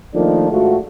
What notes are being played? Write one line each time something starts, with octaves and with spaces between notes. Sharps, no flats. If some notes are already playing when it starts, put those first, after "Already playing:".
D#3 F3 A3 A#3 D4 D#4
G#2 A3 F4 F#4